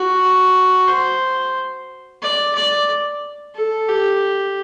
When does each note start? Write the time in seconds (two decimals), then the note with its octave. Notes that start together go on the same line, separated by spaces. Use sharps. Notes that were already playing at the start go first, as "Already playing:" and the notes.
Already playing: F#4
0.87 C5
2.22 D5
2.55 D5
3.55 A4
3.89 G4